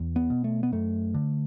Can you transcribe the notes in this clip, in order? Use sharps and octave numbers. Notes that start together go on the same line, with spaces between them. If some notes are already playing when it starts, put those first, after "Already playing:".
Already playing: E2
B3
B2
A3
B3
F#2 A3
D3